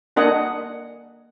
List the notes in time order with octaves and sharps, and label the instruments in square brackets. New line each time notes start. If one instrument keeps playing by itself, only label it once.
[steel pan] A#3 D4 A#4 D#5 F#5 G#5